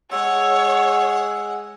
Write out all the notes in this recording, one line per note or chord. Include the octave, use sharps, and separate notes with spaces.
G#3 G#4 C#5 F#5 E6